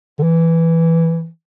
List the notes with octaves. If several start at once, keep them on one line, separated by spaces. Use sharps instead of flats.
D3
E3